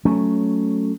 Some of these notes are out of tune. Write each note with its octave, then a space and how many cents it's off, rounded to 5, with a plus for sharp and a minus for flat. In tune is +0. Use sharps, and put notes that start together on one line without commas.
F#3 +0 A3 +0 C#4 +10